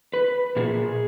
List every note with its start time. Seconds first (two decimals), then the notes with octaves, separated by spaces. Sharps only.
0.14 B4
0.56 A#2 G#4